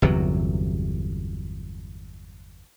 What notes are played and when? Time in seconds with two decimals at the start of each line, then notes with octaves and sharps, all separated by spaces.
0.02 G1 E2 C3 F#3